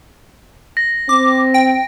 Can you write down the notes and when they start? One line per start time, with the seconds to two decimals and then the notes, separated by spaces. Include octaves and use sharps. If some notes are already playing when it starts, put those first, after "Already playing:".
0.77 A#6
1.09 C4 D6
1.54 G5